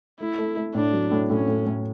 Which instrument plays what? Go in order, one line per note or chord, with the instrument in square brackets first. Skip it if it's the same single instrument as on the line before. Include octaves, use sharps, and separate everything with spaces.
[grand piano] A3 [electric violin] E4
[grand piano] A3
A3
[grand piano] A2 [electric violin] D4
[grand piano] F#3
A2
[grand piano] A2 [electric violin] C#4
[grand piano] A2
A2